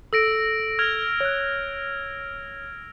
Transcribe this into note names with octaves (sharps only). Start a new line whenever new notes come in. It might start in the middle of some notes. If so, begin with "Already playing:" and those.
A4 E6 A#6 D7
F6 G#6 F7
C#5 F#6